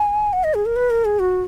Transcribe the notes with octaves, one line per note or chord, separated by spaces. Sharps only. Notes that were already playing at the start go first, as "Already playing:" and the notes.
Already playing: G#5
F#5
D#5
G#4
A#4
B4
A#4
G#4
F#4